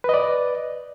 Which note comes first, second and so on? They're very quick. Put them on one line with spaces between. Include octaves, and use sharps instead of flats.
B4 D#5 D5